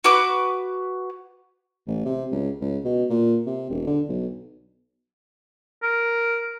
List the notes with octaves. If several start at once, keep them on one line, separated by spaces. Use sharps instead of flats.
F#4 B4 D6
A1
C3
C#2
C#2
B2
A#2
C3
E1
D3
B1
A#4